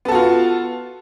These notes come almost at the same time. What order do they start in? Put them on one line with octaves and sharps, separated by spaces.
B3 A4 F#4 F4